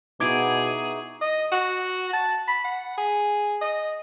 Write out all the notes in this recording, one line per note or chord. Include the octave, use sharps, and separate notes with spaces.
B2 D#4 E4 F#4 G#4 D6 G#6 D7
D#5
F#4
A5
B5
F#5
G#4
D#5